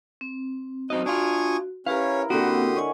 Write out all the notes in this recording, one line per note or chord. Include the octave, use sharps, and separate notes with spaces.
C4
F#2 C4 D#4 F#4 D#5
D4 F4 G#5 C#6 D#6
C#4 E4 G4 A#4 B4 C#5 F5
D3 A#3 C4 F#4 G4 B5 C6 D#6
C#5 D#5 F#5 G#5